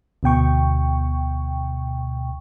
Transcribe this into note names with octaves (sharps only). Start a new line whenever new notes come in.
D2 B2 G5 C#6